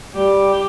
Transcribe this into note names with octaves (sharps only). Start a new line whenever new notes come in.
G3 G4